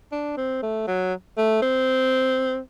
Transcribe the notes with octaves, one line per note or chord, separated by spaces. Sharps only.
D4
C4
A3
F#3
A3
C4